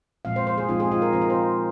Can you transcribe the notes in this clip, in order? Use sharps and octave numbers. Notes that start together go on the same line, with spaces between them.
A#2 F3 G#3 C4 F5
C5
C5
G#4
F3 G#3 C4 D#4 F4
G#4
F4
A#4
F3 C4 D#4 C5
A#4
C5